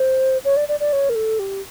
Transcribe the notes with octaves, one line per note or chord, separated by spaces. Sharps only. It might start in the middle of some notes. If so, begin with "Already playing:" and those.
Already playing: C5
C#5
D5
D5
D5
C#5
A#4
A4
G4